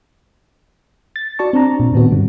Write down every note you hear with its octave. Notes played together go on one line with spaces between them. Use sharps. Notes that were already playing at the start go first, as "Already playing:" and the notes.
A6
F#4 D5 A5 C#6
C4 D4 A5 A#5
A#2
A2 D#3 B3 C4 F#4
G2 D3 G3